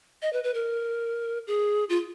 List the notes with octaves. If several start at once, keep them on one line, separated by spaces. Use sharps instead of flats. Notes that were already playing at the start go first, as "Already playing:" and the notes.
D#5
B4
B4
A#4
G#4
F4